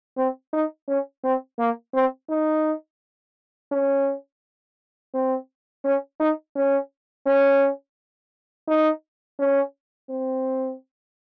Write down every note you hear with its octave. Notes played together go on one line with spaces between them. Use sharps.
C4
D#4
C#4
C4
A#3
C4
D#4
C#4
C4
C#4
D#4
C#4
C#4
D#4
C#4
C4